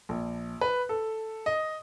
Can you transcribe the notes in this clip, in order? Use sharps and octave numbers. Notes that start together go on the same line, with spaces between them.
A#1
B4
A4
D#5